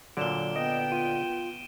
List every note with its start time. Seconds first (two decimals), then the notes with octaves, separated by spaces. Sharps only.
0.17 A#2 D3 F#3 D7 E7 G7
0.56 B3 D#5 G5 D7
0.92 F4 D#7